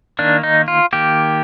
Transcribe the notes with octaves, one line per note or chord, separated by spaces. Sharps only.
D#3 A#3 D4
D#4
F4
D#3 A#3 G4